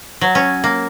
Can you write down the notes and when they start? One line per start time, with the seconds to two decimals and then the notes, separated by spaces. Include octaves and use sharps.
0.21 F#3
0.35 C#4
0.64 A#3